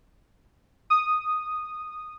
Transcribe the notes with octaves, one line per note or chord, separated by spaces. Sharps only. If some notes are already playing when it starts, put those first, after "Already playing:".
D#6